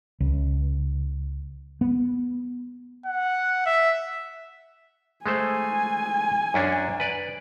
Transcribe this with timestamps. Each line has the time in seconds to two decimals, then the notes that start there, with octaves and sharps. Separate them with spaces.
0.20 C#2
1.81 B3
3.06 F#5
3.66 E5
5.26 G#3 A3 C5 G#5
6.54 F#2 C#4 D4
7.00 B4 D5